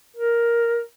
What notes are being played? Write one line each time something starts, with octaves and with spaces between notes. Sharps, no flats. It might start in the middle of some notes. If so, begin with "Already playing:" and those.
A#4